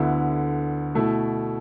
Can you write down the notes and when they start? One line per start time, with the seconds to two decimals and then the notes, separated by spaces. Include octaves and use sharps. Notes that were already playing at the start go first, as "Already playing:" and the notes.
Already playing: D2 D3 B3 E4
0.95 B2 A3 E4